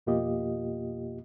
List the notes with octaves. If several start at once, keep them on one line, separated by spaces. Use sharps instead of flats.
F2 B2 A#3 F4 G4 D#5